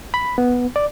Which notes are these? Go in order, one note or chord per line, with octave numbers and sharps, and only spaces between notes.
B5
B3
D5